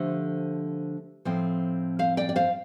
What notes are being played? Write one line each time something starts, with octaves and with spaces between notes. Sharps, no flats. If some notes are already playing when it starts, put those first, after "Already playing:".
Already playing: D3 F3 A3 G4 C5
A2 F3 C4
C5 F5
D5 G5
D5
C5 F5